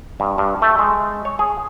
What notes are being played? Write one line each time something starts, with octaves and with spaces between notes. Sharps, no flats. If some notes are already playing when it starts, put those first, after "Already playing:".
G2
G2
A3
G#3
C#5
G#4